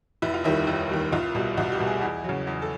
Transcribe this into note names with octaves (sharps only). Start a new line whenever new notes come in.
F1 E4
F4
D#2 D#3 G3 E4
F1 E4
D#2 D#3 G3
C2 F4
B2 G3
C2 F#4
G4
B2 G3
G#4
E2 G#4
C#3 F#3
E2
A4